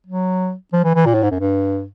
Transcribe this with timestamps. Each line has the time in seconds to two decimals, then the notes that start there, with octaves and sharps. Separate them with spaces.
0.06 F#3
0.72 F3
0.84 E3
0.95 E3
1.05 A#2
1.14 A2
1.23 G#2
1.31 F#2
1.39 G2